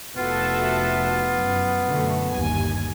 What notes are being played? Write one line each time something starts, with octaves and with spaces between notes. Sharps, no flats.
F1 B3 F4 F#4 A4 E5
F#2
F#2 B2 D3 A3
G1 D#2 G#5